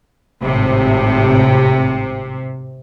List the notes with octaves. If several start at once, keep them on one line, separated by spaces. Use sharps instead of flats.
G#1 A2 C3